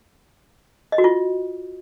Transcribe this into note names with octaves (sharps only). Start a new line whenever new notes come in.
D#5
F#4
F4